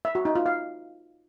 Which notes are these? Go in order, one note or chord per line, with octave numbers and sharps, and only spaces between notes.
E5
F#4
D#4
F4
F5